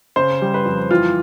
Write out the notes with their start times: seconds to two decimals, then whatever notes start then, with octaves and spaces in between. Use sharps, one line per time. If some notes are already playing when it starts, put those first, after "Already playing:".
0.16 C#3 C5
0.42 G3
0.54 B4
0.65 F2
0.91 E3 F4